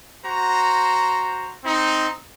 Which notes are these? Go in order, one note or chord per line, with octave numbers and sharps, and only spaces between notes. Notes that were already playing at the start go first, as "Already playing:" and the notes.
F#4 C5 A#5
C4 D#4